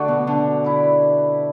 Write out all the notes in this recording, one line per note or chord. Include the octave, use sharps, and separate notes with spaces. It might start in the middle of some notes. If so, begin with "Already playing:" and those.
Already playing: D3 A3 D4 F#4 D5
B2 B3
D3 D4
E4 B4 D5